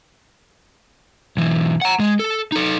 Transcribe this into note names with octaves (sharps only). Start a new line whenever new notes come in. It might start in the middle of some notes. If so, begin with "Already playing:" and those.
B1 E3
F#5 A#5
G#3
A4
D#4 A4